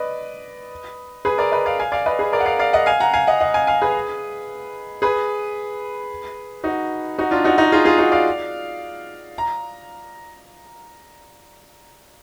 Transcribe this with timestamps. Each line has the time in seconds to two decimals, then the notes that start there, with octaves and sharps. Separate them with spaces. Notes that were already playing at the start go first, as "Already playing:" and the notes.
Already playing: B4 D5 D#5
1.25 G#4 B4
1.38 A#4 D5
1.52 B4 D#5
1.66 D5 F5
1.80 F5 G#5
1.92 D5 F5
2.06 B4 D#5
2.19 G#4 B4
2.33 A#4 D5
2.40 F#5
2.46 D5 F5
2.59 D5 F5
2.73 D#5 F#5
2.86 F5 G#5
3.00 F#5 A#5
3.14 F5 G#5
3.27 D#5 F#5
3.40 D#5 F#5
3.54 F5 G#5
3.67 F5 G#5
3.82 G#4 B4
5.02 G#4 B4
6.64 D#4 F#4
7.19 D#4 F#4
7.31 D4 F4
7.44 D#4 F#4
7.58 D#4 F#4
7.72 F4 G#4
7.85 F4 G#4
7.98 D#4 F#4
8.12 D5 F5
9.38 A#5